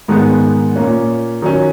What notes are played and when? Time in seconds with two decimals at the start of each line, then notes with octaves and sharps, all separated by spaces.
0.08 G#2 D#3 G#3 B3
0.76 A#2 A#3 C#4
1.42 D#3 F#3 C#4